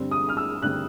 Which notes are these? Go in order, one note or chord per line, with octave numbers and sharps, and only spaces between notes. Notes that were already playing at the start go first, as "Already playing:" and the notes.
Already playing: G2 D3 G3 C4
D#6
F6
E6
G2 D3 G3 C4 F#6